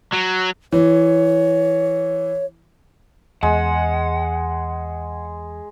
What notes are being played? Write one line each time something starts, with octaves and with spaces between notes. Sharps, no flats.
F#3
E3 C#5
E2 G#3 F#5